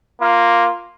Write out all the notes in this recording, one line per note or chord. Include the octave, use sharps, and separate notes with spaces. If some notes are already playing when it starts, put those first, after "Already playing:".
A#3 F4